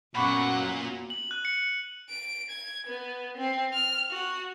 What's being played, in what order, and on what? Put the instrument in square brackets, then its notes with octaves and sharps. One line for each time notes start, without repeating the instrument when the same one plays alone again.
[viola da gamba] F#2 F#3 B3 [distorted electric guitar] A#2 [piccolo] F#5 [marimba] B5 C#6 D6
[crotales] F#7
F#6
C#7
[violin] D7
G#6
B3
C4
F6
F#4